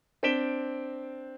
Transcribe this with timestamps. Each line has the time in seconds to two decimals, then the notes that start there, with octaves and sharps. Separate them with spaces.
0.23 C4 D4 B6 D7 E7 G7